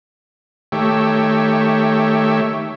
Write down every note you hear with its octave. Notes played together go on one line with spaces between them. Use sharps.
D#3 A3 G4 C#5 E5